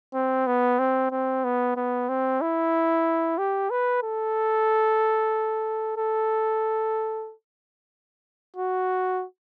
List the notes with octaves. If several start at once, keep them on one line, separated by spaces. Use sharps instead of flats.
C4
B3
C4
C4
B3
B3
C4
E4
G4
B4
A4
A4
F#4